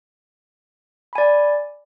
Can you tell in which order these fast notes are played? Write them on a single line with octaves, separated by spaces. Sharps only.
B5 G#5 D5